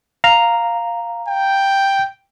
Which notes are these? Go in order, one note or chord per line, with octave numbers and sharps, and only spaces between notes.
F5 A#5
G5